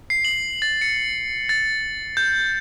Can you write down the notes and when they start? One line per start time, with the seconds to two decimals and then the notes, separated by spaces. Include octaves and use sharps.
0.10 C7
0.25 F#7
0.62 A6
0.82 C#7
1.49 A6
2.17 G6